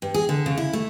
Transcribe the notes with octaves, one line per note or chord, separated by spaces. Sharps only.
G2
G#4
D3
C#3
E4
A3